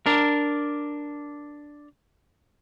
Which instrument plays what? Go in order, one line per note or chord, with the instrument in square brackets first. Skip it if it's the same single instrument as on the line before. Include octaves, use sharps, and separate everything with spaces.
[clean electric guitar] D4 A#4